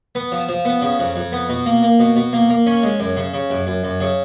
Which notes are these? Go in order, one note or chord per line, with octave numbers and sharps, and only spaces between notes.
B3
F3
F3
B3
C#3
F2
F2
B3
B2
A#3
A#3
B2
B2
A#3
A#3
C#4
G#3
F#2
C#3
C#3
F#2
F#2
F#2
C#3